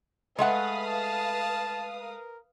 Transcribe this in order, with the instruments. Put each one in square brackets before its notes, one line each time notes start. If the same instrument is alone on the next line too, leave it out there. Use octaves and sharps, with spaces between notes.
[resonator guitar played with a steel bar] G#3 A3 F#5 [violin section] B4 F5 D#6 [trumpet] B5
[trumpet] A5
A#4